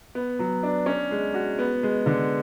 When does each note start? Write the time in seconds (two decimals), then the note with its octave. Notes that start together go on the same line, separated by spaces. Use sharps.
0.15 B3
0.39 F#3
0.63 D4
0.86 C#4
1.11 G#3
1.34 F#4
1.59 B3
1.83 G#3
2.06 D3